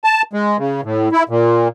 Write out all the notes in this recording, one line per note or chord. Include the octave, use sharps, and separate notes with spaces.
A5
G#3
C#3
A2
E4
A#2